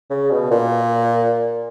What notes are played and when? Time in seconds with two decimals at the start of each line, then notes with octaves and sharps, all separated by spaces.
0.10 C#3
0.31 B2
0.51 A#2